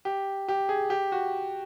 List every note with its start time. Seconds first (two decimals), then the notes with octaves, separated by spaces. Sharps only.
0.05 G4
0.48 G4
0.69 G#4
0.90 G4
1.12 F#4